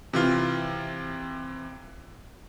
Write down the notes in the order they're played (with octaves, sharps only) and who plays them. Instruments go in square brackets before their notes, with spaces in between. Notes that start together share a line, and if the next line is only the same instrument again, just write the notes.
[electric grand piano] C3 E3 F4 F6